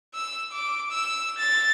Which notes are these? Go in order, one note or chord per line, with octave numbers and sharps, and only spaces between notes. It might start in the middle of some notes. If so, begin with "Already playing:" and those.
E6
D6
E6
A6